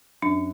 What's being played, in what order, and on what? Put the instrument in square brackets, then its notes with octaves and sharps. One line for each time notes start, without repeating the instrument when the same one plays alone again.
[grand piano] F#2 [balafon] D4